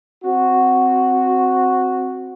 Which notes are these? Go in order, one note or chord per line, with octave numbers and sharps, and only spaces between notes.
C4 F#4